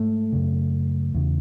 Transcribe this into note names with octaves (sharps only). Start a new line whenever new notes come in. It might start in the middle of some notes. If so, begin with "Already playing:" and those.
Already playing: G#2 A3
F#2 C#3
E2 C#3